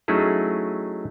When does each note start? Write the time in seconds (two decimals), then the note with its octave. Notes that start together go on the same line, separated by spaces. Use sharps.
0.08 F#3 A3 C#4 D#4 E4 G#4